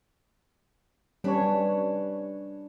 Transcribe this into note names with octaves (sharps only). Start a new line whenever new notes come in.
G3 C#4 D4 B4 C#5